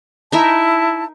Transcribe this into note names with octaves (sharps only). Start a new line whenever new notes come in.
D#4 E4 A#4 E5 A5